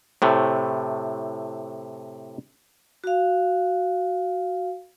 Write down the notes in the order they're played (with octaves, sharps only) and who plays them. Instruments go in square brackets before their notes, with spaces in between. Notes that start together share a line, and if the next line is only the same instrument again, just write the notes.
[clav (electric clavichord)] A2 C3 A3
[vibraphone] F#4 F5